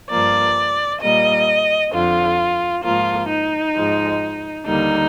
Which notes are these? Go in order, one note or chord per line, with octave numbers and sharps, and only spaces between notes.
G2 F3 A#3 D5
A#2 G3 A#3 D#5
F2 D3 F3 F4
G#2 F3 A#3 F4
D#4
G#2 F3 G#3
D#2 D3 G3 A#3 D#4